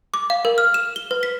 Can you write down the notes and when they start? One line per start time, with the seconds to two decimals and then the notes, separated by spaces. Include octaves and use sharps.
0.14 D6
0.30 F5
0.45 A#4
0.58 F6
0.74 E7
0.96 G7
1.11 B4
1.23 B6